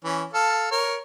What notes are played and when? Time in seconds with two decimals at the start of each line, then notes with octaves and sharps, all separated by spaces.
0.05 E3 C#4
0.33 A4 F5 A5
0.72 A#4 C#5